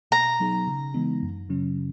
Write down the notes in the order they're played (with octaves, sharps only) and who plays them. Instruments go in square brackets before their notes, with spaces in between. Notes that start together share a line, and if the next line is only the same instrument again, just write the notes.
[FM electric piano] B2 [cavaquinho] A#5
[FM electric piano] F#3 B3 D#4 G#4
C#3
E3 G#3 B3 D#4
F#2
C#3 F#3 C#4